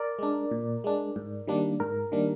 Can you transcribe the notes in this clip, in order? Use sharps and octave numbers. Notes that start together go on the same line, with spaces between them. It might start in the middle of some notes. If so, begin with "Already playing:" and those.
Already playing: A#4 D5
G#3 D4
A#2
G#3 D4
G#2
D#3 G3 A#3 D4
G#2 A#4
D#3 G3 A#3 D4